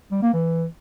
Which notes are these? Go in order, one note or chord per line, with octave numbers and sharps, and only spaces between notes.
G3
A#3
E3